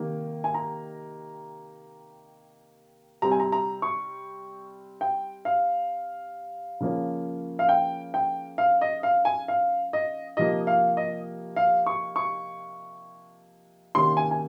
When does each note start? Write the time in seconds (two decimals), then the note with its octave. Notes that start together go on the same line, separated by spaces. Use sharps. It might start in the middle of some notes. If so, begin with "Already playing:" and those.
Already playing: C3 D#3 A#3 D#4
0.44 G#5
0.54 A#5
3.22 C3 G3 C4 A#5
3.31 G#5
3.40 A#5
3.52 A#5
3.82 C#6
5.01 G5
5.45 F5
6.80 C#3 F3 A#3 C#4
7.59 F5
7.69 G5
8.14 G5
8.58 F5
8.81 D#5
9.03 F5
9.25 G#5
9.48 F5
9.93 D#5
10.37 C3 F3 A#3 D#4 D#5
10.67 F5
10.97 D#5
11.56 F5
11.86 C#6
12.16 C#6
13.95 C3 D#3 A#3 C#4 C6
14.17 G#5
14.31 G#5